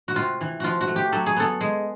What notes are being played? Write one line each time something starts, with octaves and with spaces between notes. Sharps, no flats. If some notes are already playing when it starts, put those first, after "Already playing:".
F#4
C3 F4
E3
F3 F4 F#4
F#4
A3
G4
F#3 A4
G#4
B3 A4
G#3